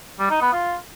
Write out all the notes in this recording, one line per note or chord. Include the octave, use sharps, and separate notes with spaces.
G3
D#4
B3
F4